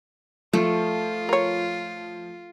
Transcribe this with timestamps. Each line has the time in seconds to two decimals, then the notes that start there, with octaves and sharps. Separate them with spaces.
0.53 F3 A3 F4
1.29 A#4 C#5